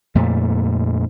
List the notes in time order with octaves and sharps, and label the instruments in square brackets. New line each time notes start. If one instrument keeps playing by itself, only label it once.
[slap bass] F2 A#2 A3